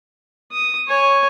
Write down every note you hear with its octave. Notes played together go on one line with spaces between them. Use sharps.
D#6
C#5 G#5